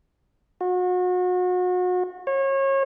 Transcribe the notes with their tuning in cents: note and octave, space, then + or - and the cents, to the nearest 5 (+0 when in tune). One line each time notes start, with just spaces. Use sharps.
F#4 -35
C#5 -30